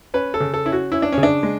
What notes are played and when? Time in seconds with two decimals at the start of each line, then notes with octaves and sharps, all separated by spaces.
0.14 C#4 B4
0.34 A4
0.40 C#3
0.54 A4
0.66 C#4 E4
0.72 F#4
0.92 C#4 E4
1.02 D4
1.12 C#4
1.18 C#3
1.23 D4
1.43 G#3